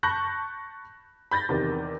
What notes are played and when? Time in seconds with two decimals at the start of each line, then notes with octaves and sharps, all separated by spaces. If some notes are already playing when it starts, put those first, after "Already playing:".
0.03 A5 B5 C#6 F#6 G6 A#6
1.31 B5 G6 A6 A#6
1.49 E2 C3 D#3